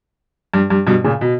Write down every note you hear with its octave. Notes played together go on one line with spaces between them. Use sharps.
G2
G2
G2 B2
A#2 C#3
B2